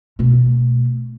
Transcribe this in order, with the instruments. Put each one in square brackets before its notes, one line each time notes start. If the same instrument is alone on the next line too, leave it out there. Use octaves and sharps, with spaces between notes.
[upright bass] B2 A3